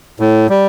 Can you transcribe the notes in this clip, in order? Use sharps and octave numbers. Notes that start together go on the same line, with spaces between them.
A2
G3